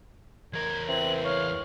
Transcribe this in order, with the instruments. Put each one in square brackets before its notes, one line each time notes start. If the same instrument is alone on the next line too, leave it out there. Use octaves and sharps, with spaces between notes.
[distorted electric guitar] E2 A#4 [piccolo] G#6
[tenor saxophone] E3 [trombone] C4 [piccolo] F#7
[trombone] C#5 [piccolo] F5